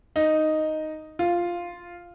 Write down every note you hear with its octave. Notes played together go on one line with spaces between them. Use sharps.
D#4
F4